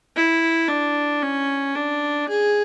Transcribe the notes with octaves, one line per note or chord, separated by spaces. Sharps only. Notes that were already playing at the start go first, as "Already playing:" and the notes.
E4
D4
C#4
D4
G#4